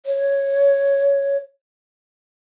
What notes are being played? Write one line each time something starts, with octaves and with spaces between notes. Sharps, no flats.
C#5